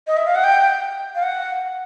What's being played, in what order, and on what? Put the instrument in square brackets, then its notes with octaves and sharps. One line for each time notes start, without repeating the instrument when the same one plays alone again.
[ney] D#5
E5
F5
F#5
G5
F5
F#5